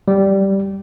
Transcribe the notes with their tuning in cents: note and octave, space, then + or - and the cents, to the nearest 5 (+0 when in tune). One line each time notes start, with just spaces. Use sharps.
G3 -5